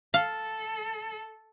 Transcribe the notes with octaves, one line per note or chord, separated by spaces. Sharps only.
A4 F5